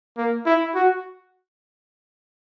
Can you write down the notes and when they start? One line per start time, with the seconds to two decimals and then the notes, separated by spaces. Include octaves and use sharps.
0.18 A#3
0.46 E4
0.75 F#4